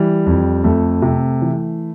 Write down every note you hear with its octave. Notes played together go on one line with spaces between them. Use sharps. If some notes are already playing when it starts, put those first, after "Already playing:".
Already playing: E3 G3
F2
F2 A3
C3
E3